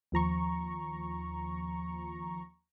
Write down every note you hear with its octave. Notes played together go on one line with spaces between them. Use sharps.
D#2 F3 A#5 C#6